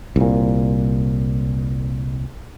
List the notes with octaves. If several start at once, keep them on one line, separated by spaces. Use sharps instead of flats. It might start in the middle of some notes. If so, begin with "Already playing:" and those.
C2 A#2